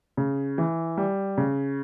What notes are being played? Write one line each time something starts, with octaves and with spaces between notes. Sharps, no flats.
C#3
E3
G3
C#3